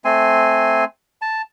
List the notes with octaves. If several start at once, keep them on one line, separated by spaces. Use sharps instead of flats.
A3 C4 G#5 C6
A5